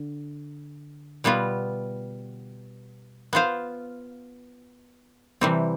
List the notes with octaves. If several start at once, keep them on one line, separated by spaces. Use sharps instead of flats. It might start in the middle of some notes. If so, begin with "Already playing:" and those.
Already playing: D3
B2 G3 B3 F4
B3 F4 C5 F5
C3 E3 G3 C4